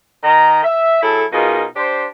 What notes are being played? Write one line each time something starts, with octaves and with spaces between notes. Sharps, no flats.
D#3 A#5
E5
F#3 E4 G#4 A4
B2 D#4 F4 G#4 A#4
D4 G4 C5